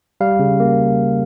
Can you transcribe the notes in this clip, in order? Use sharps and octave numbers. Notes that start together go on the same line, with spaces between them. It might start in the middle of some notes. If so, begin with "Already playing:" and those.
G3 F5
C#3
A#3